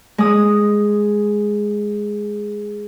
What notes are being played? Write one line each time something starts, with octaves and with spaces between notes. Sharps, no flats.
G#3 D#6